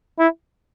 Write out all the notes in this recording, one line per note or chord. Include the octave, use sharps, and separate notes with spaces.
E4